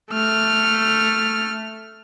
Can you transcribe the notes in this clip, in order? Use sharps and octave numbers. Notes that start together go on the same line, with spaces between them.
A3 F6